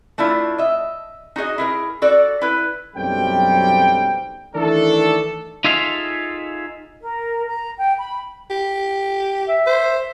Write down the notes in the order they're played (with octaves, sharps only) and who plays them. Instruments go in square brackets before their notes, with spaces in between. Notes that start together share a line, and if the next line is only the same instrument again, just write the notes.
[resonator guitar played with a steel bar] A3 D4 E4 F4
D#5 E5
D#4 F#4 G#4 D#5
E4 G#4 A#4
F#4 A4 D5
E4 B4
[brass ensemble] B1 F#2 G3 A3 C4 G5
D#3 E3 A3 D4 E4 A4
[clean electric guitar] D#4 F4 G#4 A4 E5 F5
[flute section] A#4
A#5
G5
B5
[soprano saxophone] G4
[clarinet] E5
[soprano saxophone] C5